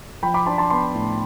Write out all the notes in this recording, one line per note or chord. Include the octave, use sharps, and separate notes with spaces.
F3 G5 B5
B5 D6
D4 A5 C6
A5 C6
B3 A5 C6
A2